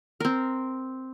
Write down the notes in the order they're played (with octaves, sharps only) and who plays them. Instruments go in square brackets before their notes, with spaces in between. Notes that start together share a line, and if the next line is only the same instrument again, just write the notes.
[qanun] C4 A#4